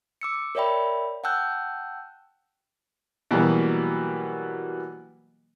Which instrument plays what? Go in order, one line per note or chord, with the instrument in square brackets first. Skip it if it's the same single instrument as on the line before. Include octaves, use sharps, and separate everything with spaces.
[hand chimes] D6 E6 C#7
A#4 C#5 D5 E5 G5 B5
F#5 G5 A5 E6 F#6 G6
[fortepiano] B2 E3 F#3 G3 A#3 B3